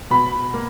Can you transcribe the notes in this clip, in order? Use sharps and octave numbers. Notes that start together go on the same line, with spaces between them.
B2 B5
A#3